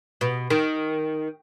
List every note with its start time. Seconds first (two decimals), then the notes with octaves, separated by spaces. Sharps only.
0.21 B2
0.50 D#3